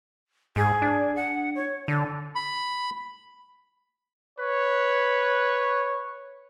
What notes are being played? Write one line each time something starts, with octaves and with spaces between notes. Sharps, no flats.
G#2 G#4
D4
F#5
C#5
D3 A4
B5
B4 C#5